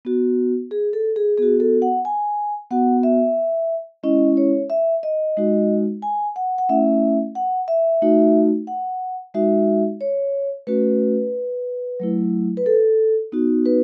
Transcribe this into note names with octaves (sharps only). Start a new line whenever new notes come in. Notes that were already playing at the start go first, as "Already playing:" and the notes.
B3 F#4
G#4
A4
G#4
B3 F#4 G#4
A4
F#5
G#5
B3 F#4 F#5
E5
G#3 C#4 E4 D#5
C#5
E5
D#5
G#3 D#4 F#4
G#5
F#5
F#5
A3 C#4 E4 E5
F#5
E5
A3 D#4 F#4
F#5
G#3 D#4 F#4 E5
C#5
A3 C#4 F#4 B4
F#3 A3 E4
B4
A4
B3 D#4 F#4
B4